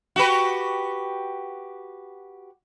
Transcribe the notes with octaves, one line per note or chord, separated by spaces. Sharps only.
F#4 G4 B4